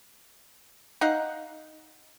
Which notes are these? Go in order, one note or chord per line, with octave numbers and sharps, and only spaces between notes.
D#4 F5 F#5